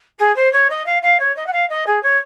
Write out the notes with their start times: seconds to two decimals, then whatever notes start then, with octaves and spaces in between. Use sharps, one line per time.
0.19 G#4
0.36 C5
0.52 C#5
0.70 D#5
0.86 F5
1.02 F5
1.19 C#5
1.36 D#5
1.46 F#5
1.52 F5
1.69 D#5
1.86 G#4
2.03 C#5